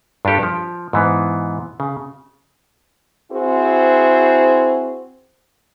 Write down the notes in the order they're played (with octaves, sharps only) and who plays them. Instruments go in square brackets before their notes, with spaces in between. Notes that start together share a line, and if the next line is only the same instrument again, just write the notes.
[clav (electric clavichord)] G2 D4 F4 G4 A4
F3
G#2 E3 B3
C#3
[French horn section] C4 E4 F#4 G#4 C5